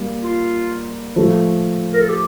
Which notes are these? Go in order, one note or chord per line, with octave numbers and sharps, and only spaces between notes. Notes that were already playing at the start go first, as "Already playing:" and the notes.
Already playing: G3 A#3
F4
F3 A3
A#4
A4
G4